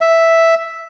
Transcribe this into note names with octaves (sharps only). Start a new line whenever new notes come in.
E5